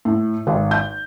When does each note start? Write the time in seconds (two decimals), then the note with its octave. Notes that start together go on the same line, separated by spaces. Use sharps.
0.05 A2
0.47 G#1
0.71 G6